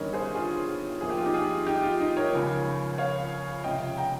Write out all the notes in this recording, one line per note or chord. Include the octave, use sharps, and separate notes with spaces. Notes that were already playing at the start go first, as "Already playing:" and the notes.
Already playing: G1 G2 D#3 G3 C#4 A#4 C#5 D#5
G#4 C5
F4 G#4
F4
A#1 A#2 F3 A#3 G#4
G4
F4
D#4 G4
F4 G#4
D#4 G4
F4
D#4
A#4 C#5
C#2 C#3 F3
C#5 F5
C#2 C3 F3 G#3 C#4 D#5 G5
G5 A#5